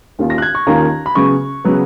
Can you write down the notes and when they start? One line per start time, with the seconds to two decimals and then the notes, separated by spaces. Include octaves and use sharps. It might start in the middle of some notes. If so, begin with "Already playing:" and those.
0.19 D#2 D#3 A#3 C#4 F4
0.30 A#6
0.38 F#6
0.42 G#6
0.55 C#6
0.67 D#2 D#3 A#3 C#4 F4 A#5
1.06 B5
1.15 C#3 F#3 B3 C#6
1.65 C#3 F#3 B3